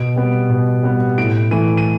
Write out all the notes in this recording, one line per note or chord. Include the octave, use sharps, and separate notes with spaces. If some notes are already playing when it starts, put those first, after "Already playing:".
Already playing: B2 D7
G3 B3
B2
G3 B3
A2 D7
E3 A3 D#7
D#7